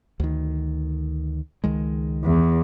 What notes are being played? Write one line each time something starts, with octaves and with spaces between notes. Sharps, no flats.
D2 D#3
C#2 D#3 G#3
E2